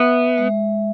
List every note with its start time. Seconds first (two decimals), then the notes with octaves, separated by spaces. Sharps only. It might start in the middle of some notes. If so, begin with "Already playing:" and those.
Already playing: B3 E5
0.38 G#3